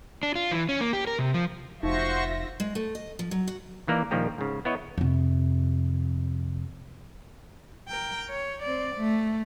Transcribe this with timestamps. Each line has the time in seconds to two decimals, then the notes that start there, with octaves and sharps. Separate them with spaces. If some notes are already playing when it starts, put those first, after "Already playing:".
0.23 D4
0.36 F4
0.51 E3
0.69 C#4
0.81 A#3
0.93 G4
1.07 A#4
1.19 C3
1.34 F3
1.83 F1 D#4 F4 F#4 C5 E5 C#6 A#6
2.60 G#3
2.75 A3
2.95 D#5
3.19 F3
3.31 F#3
3.48 F#4
3.87 D#3 E3 A#3 A#4 D5
4.11 A#1 D#3 F3 G3 A#3 G4
4.38 G#2 C#3
4.65 B3 E4 C#5 D#5
4.98 F2 C3
7.88 A#4 G5
8.30 C#5
8.63 C4 D5
8.96 A3